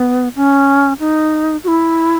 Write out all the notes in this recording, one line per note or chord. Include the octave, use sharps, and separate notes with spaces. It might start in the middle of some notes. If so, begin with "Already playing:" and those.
Already playing: B3
C#4
D#4
F#4
E4